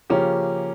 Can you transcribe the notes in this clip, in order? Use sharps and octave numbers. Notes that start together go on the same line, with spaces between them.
C#3 F3 A#3 C#4 G4